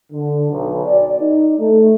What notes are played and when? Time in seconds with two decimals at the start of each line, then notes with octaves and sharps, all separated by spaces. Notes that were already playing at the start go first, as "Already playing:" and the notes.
0.13 D3
0.51 B1
0.85 D5
1.21 D#4
1.59 A3